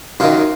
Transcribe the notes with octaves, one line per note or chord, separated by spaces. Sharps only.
F#2 D#3 F4